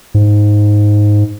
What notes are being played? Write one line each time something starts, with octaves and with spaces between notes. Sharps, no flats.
G#2